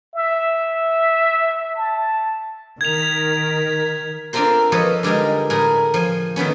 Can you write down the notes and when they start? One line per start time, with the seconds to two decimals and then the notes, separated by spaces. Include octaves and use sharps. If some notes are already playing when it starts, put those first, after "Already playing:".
0.14 E5
1.76 A5
2.81 D#3 A#4 G#6 B6 F7
4.33 C4 D4 F4 A4 A#4 C5
4.72 F3 A4 B4 C#5 D#5
5.03 D3 G3 G#3 D#4 A#4
5.50 A2 G#4 A#4
5.94 F3 G#5
6.36 D#3 A3 B3 C#4